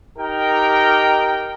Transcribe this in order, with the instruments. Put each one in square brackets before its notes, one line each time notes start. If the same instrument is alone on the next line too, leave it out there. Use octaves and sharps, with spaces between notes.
[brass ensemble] D#4 G4 A#4 G5